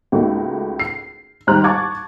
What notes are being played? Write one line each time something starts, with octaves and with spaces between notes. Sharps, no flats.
C#2 A3 A#3 D#4 F#4
C7
D#2 G#2 G3 C5 A#5 F#6
A5 C#6 D6 G#6 A6